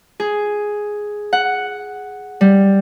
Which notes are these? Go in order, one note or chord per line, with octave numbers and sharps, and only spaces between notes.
G#4
F#5
G3